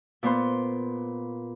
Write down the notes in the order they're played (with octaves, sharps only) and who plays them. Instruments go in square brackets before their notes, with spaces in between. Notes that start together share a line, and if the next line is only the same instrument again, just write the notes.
[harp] A#2 B3 C5 C6